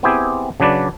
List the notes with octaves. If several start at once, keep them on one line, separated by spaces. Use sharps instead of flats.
B3 C4 E4 G4 G#4
C#3 F#3 D4 B4 D5